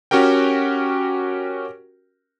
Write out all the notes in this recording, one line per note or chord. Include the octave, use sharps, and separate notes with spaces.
C#4 F#4 G4 A#4 G5